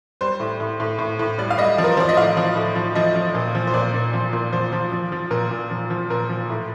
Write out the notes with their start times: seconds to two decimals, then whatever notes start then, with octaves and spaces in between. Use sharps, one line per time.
0.21 G3 C5
0.40 A2
0.60 A2
0.80 A2
0.99 A2
1.19 A2
1.38 G3 D5
1.50 F5
1.58 G3 D#5
1.78 F3
1.84 A#4
1.92 C5
1.97 F3 D5
2.09 D#5
2.17 A2 F5
2.37 F3
2.56 A2
2.75 F3
2.95 F3 D#5
3.15 F3
3.35 A#2
3.55 F3
3.67 C5
3.73 A#2 D5
3.94 A#2
4.13 F3
4.33 A#2
4.52 F3 C5
4.72 F3
4.92 F3
5.12 F3
5.31 A#2 A#4
5.51 A#2
5.70 F3
5.90 F3
6.10 A#2 A#4
6.29 F3
6.50 A2